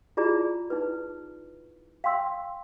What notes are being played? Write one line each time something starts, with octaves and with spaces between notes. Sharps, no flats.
E4 F4 G#4 D5 A#5
D#4 E4 B4
F5 G5 C6 E6